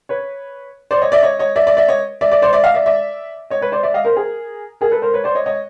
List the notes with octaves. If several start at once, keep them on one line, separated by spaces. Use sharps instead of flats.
B4 C#5
C5 D5
C#5 D#5
D5 E5
C#5 D#5
C#5 D#5
D5 E5
D5 E5
D5 E5
C#5 D#5
D5 E5
D5 E5
C5 D5
D5 E5
D#5 F5
D5 E5
D5 E5
C#5 D#5
B4 C#5
C5 D5
D5 E5
D#5 F5
A#4 C5
G#4 A#4
G#4 A#4
A4 B4
A#4 C5
B4 C#5
C5 D5
C#5 D#5
C#5 D#5